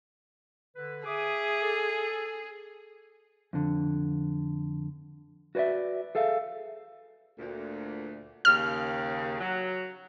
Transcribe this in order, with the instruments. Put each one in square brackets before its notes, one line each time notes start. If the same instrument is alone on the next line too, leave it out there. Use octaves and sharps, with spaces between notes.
[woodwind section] D3 B4
[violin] G#4 [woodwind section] E5 D6 D#6
[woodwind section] A4
[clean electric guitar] F2 D3
F#4 B4 C#5 D5 E5
G#4 A4 E5 F5
[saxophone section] D2 A#2
[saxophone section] D#2 C#3 [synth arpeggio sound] F6
[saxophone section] F#3